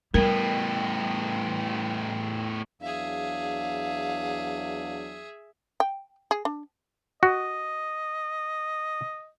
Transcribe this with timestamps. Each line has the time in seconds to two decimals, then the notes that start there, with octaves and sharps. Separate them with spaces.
0.14 A2 G3 B3 A#4 G5
2.81 E2 F#3 D4 G#4 E5 F5
5.80 G5
6.31 G#4
6.45 D4
7.23 F#4 D#5